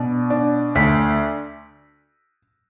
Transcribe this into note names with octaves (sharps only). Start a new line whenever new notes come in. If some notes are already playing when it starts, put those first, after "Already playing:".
Already playing: B2 D4
D4
D2 B6